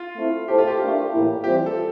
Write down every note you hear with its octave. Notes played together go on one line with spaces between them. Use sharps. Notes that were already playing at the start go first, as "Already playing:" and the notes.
Already playing: F4
A3 C4 E4
A3 E4 G4 A4 C5
F4
G4
A3 D4 F4 A#4
A2 E3 A#3 E4
E3 G3 C4 F4 G4 C5
A4